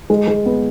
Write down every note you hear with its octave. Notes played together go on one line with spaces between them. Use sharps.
G#3
G#3
B3